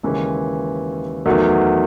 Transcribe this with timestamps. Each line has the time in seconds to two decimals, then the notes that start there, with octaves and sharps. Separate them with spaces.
0.03 D#2 C#3 E3 G#3 C#4
1.26 E2 D#3 F#3 A3